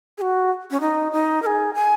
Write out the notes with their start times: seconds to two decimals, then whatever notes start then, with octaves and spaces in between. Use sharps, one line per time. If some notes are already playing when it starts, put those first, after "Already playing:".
0.18 G#4
0.21 F#4
0.71 C#4
0.80 D#4
1.12 D#4
1.42 A#4
1.46 G#4
1.74 G#5